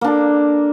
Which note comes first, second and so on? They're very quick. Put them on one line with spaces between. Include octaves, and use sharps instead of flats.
A#3 D4 A4